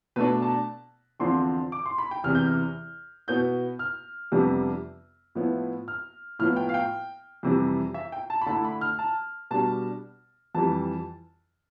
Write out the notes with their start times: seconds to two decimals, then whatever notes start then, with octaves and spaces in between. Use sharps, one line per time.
0.16 B2 A3 D4 B4
0.42 A5
1.20 E2 D3 F3 C4 C6
1.72 D6
1.86 C6
1.98 B5
2.11 G5
2.24 E2 C3 E3 F6
2.35 G6
2.46 F6
3.28 B2 B3 E4 G6
3.79 F6
4.32 F2 C3 G3 B3 D4
5.35 A2 F3 B3 E4
5.88 F6
6.39 A2 F3 B3 F6
6.56 G5
6.69 F5
6.74 G5
7.43 F2 C3 E3 G3
7.94 E5
8.12 G5
8.30 A5
8.42 B5
8.46 D3 A3 E4 A5
8.65 B5
8.81 F6
8.99 A5
9.51 B2 G3 D4 A5
10.55 F2 E3 G3 A5